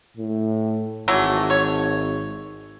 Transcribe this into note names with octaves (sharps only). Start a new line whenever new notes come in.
A2
G#1 E3 F#3 A3
C#5